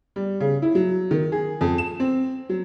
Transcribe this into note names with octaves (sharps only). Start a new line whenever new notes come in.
G3
C#3
E4
F#3
D#3
G#4
F2
E7
C4
F#3